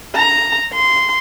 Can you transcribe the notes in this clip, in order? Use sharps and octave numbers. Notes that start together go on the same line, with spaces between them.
A#5
C6